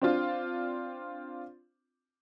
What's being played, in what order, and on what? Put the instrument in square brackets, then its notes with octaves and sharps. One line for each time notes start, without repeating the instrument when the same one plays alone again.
[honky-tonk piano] C4 D4 F4